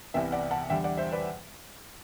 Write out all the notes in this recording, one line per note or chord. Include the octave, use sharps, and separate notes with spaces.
C2 C3 E3 B3 E5 G5
D5 F#5
F#5 A5
E2 D3 G3 E5 G5
D5 F#5
C5 E5
B4 D5